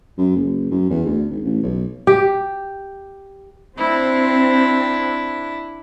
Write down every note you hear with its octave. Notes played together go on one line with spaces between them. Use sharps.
F#2
F#1
F#2
E2
D2
G#1
A1
B1
G4
C4 D4 E4